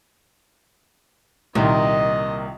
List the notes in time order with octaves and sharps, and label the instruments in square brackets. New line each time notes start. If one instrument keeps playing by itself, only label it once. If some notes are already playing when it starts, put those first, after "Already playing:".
[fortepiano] C2 D#3 [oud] A#2 [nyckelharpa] D#5